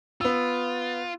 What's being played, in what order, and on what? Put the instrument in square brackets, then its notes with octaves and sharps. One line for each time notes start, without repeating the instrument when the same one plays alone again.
[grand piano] B3 E6 [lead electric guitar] F4